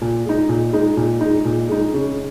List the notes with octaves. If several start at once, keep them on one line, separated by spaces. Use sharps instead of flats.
A#2
G#3 D#4
A#2
G#3 D#4
A#2
G#3 D#4
A#2
G#3 D#4
C#3